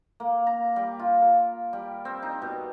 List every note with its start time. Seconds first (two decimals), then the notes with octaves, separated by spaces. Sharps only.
0.20 A#3
0.47 A#5
0.76 G3
0.99 F4
1.21 A#4
1.73 G3
2.05 C4
2.22 D#4
2.42 B2